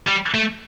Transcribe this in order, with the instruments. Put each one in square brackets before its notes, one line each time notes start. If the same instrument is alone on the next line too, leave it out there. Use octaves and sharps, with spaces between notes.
[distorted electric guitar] G3
A3